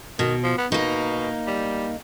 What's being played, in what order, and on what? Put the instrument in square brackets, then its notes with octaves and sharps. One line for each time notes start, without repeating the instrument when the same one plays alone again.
[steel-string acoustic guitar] B2 [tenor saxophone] D#3
[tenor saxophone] F3
B3
[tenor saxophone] B2 [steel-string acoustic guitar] A#3 D#4
[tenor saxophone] G3